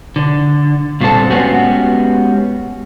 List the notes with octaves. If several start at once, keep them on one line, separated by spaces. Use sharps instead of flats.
D3
G2 A#2 D3 C4 A4 A5
G#3 B3 C#4 F#4 G4